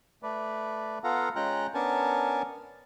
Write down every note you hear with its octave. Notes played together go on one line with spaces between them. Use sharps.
A3 B4 D5
B3 F4 A4 F5 F#5 A#5
G#3 C#4 F4 G5 A#5 F#6
B3 C#4 D4 A#4 G#5 A5